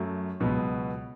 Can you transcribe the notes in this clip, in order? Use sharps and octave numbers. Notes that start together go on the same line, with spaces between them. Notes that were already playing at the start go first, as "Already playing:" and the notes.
Already playing: F#2 F#3 A3
C#2 B2 F#3 B3